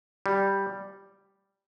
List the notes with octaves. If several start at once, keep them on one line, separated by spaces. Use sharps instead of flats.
G3